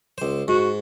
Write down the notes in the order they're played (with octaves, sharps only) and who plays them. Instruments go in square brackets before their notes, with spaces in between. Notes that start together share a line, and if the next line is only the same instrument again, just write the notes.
[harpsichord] C#2 C5
[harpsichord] G#2 [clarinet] F#4